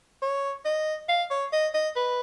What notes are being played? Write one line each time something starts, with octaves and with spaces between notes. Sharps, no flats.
C#5
D#5
F5
C#5
D#5
D#5
B4